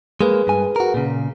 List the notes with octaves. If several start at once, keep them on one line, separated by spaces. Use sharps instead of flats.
G#3 A#3 G#4 B4
G2 G#5
F#4 A#4
A#2 C#3